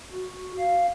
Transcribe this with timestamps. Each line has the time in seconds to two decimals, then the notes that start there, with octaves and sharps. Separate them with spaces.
0.12 F#4
0.58 F5